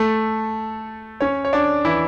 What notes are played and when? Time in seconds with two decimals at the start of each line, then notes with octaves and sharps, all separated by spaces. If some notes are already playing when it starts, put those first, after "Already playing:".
Already playing: A3 A4
1.20 C#4 C#5
1.45 C#5
1.53 D4 D5
1.85 E3 E4